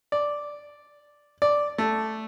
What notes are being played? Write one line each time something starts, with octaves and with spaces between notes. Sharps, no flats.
D5
D5
A3